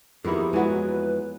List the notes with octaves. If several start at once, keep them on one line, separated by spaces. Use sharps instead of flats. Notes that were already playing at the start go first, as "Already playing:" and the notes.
F2 D#3 A#3 B3 E4 G4 G#4
E3 F#3 G#3 F#4 B4